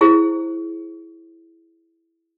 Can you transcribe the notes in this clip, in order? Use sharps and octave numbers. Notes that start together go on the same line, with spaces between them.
E4 G#4 C5